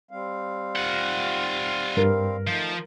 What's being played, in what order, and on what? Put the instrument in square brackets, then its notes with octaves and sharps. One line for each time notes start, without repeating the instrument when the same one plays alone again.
[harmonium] G3 C4 F5
[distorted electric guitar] F4 F#5
[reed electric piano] G2 [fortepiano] A#4
[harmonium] D#3 A3 D#4 [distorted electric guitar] F3